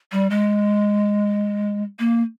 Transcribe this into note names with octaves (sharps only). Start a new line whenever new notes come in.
G3
G#3
A#3